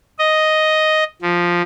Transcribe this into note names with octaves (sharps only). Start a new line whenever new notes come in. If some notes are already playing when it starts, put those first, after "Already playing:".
D#5
F3